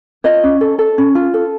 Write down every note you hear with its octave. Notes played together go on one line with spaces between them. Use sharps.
F4 C#5 D#5
C#4
A4
A4
C#4
F4
A4